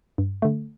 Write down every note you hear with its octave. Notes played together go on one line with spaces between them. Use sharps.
G2
D3 A3